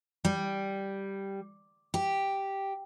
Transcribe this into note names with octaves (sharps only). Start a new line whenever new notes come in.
G3
G4